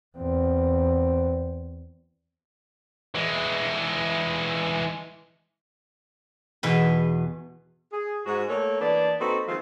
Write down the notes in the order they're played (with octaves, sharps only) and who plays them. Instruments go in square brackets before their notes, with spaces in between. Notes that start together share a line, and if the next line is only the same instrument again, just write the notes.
[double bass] E2 C4
[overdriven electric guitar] E3 G#3
[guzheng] E2 B2 B4
[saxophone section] G#4
G#2 F#4
A3 A#3 A4 A#4 C#5
E3 A#3 B3 D4 D5
A#3 C4 D#4 F#4 A4 B4
D#3 F3 G#3 C4 F4